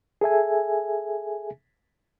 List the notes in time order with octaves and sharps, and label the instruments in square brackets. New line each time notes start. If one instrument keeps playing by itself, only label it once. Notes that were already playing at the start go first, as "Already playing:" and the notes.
[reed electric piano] G#4 A4 E5 G#5